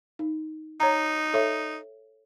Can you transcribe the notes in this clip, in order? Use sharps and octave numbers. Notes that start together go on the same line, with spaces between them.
D#4
D#4 C#5 A#5
A4 C#5 E5